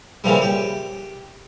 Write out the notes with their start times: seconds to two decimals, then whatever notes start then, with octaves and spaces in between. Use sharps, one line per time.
0.24 A#2 C#3 E3 F3 G3
0.42 G4